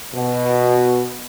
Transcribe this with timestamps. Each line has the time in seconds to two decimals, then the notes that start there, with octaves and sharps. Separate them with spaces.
0.14 B2